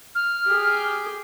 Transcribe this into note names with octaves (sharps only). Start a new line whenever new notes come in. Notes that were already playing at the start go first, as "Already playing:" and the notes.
F6
G4 G#4